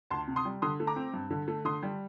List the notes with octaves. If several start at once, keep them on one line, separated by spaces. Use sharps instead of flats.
D2 A5 C6
C3
C6 D#6
G3
D3 C6 D#6
A3
A#5 D6
C4
G2
D3
A3
D3 C6 D#6
G3